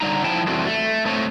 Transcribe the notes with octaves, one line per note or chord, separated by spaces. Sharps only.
D3 F#3 G3 D#4 A#5
F3 E4 G5 A5
E3 G3 C4 F#4 A4 C5
A3
A3 C4 A4 C#5